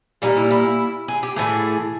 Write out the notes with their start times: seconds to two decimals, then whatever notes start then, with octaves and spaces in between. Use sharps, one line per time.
0.22 A#2 G3 A#3 D#4
0.36 E4
0.51 E4
1.08 G#4
1.23 G4
1.36 A2 E3 A3 G#4